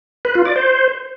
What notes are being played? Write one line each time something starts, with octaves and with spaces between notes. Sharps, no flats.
B4
F4
D5
C5